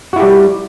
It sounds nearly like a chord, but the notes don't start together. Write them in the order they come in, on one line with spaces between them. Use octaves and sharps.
F#4 E4 G4 G3